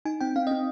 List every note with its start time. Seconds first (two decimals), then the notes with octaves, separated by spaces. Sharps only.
0.05 D#4 G#5
0.21 C4 G5
0.36 C4 F5
0.47 D#5
0.51 C4